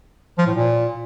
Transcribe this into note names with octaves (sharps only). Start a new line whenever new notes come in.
F3
A2
A#2